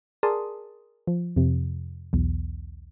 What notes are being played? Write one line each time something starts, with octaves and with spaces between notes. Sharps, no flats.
G#4 A#4 D5 A5 C6 D#6
F3
F2 C3
B1 E2